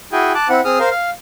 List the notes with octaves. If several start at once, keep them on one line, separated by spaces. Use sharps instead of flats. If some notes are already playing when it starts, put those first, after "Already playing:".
E4 F#4 G#4 G5 G#5
A5 D6 F#6
C4 E4 F#5
C4 G#4 D#6 F6
A#4 C5 F5
F5